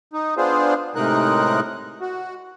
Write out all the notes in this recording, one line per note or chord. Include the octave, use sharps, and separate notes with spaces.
D#4
B3 D4 F4 G#4 C5
A2 C3 G#3 D#4 A#4 F#6
F#4